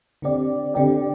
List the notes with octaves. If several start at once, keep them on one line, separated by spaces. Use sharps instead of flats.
D3 C4 G4 D5
D3 C4 G4 D5